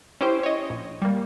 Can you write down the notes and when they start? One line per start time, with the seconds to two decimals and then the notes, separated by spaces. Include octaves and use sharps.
0.21 C#4 E4 G4 C5
0.43 C#5 D#5
0.70 A#1
1.02 G3 A#3